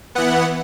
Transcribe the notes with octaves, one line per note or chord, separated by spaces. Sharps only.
E3 B3 F#5